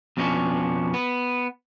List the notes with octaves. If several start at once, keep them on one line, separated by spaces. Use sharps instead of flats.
F2 B2 F3 G3 C#4 D4
B3